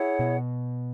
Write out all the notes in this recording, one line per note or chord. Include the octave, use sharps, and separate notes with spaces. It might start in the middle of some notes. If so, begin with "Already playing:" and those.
Already playing: E4 G#4 C#5 F#5
B2